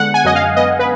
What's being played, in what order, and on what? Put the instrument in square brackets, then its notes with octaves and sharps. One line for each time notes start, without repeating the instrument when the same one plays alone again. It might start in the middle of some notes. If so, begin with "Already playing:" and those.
Already playing: [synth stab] D3 G#3 B3 F#5
G#5
F#2 D#5
F5
B3 D#5
B4